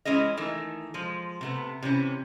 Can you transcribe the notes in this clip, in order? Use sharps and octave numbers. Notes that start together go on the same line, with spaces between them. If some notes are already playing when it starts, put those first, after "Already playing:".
E3 G#3 C#4 G#4 D#5
D#3 E3 A3
F3 G#3
C3 A3 B3
C3 E3 C#4